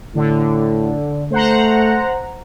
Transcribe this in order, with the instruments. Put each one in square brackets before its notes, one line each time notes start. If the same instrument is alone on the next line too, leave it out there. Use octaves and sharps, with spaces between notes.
[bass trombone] A2 [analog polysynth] D3
[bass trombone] A3 [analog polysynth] C5 F#5 A#5